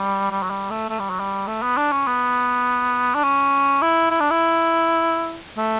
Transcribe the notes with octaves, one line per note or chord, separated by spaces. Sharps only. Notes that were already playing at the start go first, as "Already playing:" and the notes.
Already playing: G3
G3
F#3
G3
A3
A3
G3
F#3
G3
A3
B3
D4
C#4
B3
D4
C#4
E4
E4
D4
E4
A3